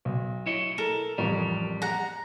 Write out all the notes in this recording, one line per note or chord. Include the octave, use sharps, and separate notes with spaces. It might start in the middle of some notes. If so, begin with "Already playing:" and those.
B1
E4 C#5 D#5
A4 A#4
A1 F2 G3
F#5 A#5